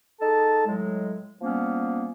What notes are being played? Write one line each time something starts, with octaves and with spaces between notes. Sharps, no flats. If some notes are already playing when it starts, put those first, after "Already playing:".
D#4 G#4 A4 A5
A2 F#3 G#3
F3 G3 A#3 B3 C#4